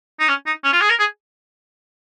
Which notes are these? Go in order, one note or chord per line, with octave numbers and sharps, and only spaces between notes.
D#4
C#4
D#4
C#4
F4
G#4
A#4
G#4